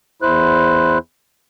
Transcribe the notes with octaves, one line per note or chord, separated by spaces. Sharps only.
E2 E4 C5 F#6